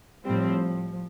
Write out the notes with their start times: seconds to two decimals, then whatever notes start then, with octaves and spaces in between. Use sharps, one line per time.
0.24 A2 F3 G3 C4